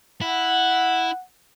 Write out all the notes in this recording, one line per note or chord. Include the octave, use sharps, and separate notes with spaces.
E4 F#5